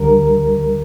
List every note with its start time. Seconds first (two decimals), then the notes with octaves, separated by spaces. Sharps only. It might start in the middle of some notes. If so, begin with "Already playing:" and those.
Already playing: D2 D3 G3 A#4